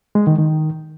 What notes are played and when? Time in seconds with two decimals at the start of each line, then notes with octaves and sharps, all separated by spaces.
0.15 G#3
0.27 D#3
0.39 D#3